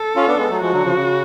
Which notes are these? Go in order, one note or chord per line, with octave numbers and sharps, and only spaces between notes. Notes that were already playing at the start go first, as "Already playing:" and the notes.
Already playing: A4
C#4 F4
B3 D4
G#3 B3
F#3 A3
F3 G#3 F#4
D3 F#3
C#3 F3
C#3